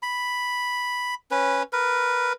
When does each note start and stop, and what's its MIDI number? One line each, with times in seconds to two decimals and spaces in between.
0.02 1.14 83
1.31 1.63 61
1.31 1.63 71
1.73 2.33 70
1.73 2.33 71